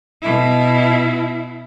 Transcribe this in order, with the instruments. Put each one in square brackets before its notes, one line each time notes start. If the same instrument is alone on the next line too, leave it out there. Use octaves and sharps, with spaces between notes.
[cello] B2 E4